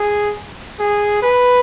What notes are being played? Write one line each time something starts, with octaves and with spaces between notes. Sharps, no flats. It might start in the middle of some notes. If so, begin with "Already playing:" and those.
Already playing: G#4
G#4
B4